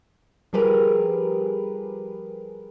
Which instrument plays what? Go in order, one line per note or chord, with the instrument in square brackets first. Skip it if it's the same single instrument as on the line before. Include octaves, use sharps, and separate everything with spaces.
[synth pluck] F3 G3 G4 G#4 A#4 B4